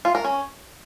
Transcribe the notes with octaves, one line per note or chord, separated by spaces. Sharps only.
F4
A#4
C#4